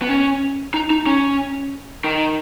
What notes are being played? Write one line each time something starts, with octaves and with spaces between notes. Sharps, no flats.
B3
C#4
D#4
D#4
C#4
D#3